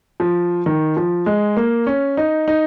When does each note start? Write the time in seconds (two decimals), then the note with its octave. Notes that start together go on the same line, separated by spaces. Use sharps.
0.20 F3
0.66 D#3
0.97 F3
1.26 G#3
1.57 A#3
1.87 C#4
2.17 D#4
2.48 D#4